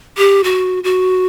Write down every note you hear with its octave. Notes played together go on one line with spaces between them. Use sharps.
G4
F#4
F#4